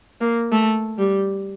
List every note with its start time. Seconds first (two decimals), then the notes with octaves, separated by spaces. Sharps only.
0.21 A#3
0.52 A3
0.98 G3